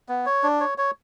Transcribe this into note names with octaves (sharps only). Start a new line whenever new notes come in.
B3
C#5
D4
C#5
C#5